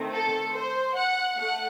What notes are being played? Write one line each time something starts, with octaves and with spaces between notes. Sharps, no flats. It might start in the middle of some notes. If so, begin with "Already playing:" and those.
Already playing: D#3 A3 C4
A4
C5
F#5
A3 F#5